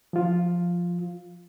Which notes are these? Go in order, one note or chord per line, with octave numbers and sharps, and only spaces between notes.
F3 F4